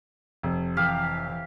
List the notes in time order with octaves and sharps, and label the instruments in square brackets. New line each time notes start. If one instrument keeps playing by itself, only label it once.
[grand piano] F1
[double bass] E3 [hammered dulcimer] G4 F5